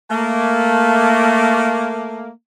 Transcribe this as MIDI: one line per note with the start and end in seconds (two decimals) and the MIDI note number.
0.11 2.28 57
0.11 2.28 58